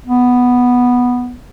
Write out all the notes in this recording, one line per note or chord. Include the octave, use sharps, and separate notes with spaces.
B3